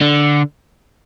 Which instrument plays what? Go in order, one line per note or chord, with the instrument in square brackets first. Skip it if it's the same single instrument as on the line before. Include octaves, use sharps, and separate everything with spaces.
[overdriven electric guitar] D3